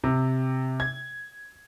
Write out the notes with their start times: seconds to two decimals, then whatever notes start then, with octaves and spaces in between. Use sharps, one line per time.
0.04 C3
0.80 G#6